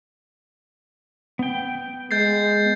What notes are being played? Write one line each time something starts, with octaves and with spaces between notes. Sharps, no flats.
B3 G5
G#3 G6 A6 C7